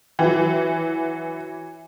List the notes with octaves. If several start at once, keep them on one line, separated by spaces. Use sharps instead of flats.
E3 F#3